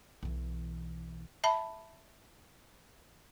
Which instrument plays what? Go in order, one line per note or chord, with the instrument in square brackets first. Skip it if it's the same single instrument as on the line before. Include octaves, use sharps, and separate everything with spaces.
[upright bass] B1 E3
[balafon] E5 A5 B5